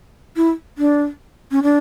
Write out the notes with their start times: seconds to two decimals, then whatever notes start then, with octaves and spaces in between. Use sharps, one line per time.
0.37 E4
0.78 D4
1.51 C#4
1.63 D4